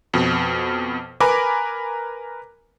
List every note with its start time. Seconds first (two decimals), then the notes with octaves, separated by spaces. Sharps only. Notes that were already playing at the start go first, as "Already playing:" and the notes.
0.14 F2 B2
1.20 A#4 B4 G#5 A#5 B5 D6